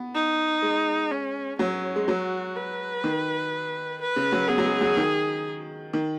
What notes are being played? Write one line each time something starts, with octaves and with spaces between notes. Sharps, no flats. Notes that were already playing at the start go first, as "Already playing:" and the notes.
Already playing: B3
D#4
G#3
C#4
F#3 C#4
G#3
F#3 F#4
B4
D#3
B4
C#3
F#3
B3 G#4
F#3
G#3
F#3
D#3
D#3